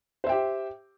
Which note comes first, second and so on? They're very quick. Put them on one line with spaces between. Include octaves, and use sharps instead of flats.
C5 E5 G5 G4